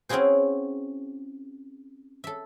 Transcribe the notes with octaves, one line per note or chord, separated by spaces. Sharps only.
C4 C#4 E4 F#4 G#4 C5
A4 E5